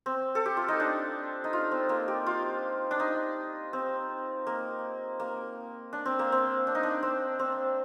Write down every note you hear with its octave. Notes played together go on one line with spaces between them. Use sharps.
C4
A4
G4
F4
D#4
D4
D#4
F4
C4
A#3
G4
F4
D4
D#4
C4
A#3
A#3
D4
C4
A#3
C4
D4
D#4
D4
C4
C4